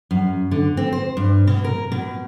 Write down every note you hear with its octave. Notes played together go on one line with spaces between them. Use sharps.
F#2
D3
C4
C5
G2
B2
A#4
B2